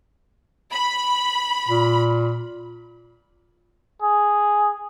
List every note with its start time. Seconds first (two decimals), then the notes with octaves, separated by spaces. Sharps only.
0.73 B5
1.68 A#2
4.02 G#4